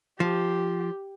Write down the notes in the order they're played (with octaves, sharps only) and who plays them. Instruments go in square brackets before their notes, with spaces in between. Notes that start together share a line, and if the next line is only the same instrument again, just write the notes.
[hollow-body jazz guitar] F3 [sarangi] G4